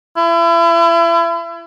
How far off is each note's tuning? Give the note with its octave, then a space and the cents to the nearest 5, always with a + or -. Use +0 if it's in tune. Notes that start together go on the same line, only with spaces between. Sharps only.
E4 +35